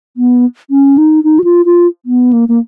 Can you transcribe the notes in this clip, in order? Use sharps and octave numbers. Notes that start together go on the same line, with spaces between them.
B3
C#4
D#4
D#4
F#4
F4
F4
B3
A#3
A#3